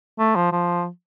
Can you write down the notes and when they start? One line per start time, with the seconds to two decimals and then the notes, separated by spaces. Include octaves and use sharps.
0.19 A3
0.36 F3
0.52 F3